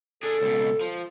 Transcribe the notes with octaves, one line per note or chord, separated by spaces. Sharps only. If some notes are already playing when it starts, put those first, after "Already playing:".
D4 G#4 A4
C#2 B2
F3